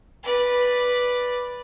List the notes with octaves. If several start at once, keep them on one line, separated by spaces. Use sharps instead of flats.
B4 D5